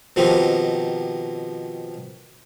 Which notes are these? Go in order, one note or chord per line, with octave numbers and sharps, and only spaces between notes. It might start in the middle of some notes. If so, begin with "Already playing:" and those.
B2 D#3 F3 C4 D#4 G4